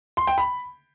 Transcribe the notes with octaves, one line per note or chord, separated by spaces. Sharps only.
C6
G5
B5